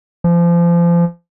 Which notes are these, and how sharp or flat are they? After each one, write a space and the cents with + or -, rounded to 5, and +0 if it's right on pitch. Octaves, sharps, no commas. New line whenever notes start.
F3 -30